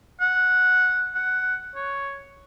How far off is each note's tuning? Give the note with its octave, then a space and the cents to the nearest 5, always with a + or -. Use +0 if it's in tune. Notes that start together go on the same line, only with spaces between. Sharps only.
F#5 -10
F#5 +5
C#5 +5